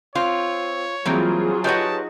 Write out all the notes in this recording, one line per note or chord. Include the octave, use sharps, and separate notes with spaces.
C4 F4 C#5
E3 F#3 G3 A#3 C4 F4 G#4
D#4 F#4 G4 B4 C#5 A5